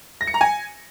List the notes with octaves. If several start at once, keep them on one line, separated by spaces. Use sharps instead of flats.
A#6
C#7
A#5
G#5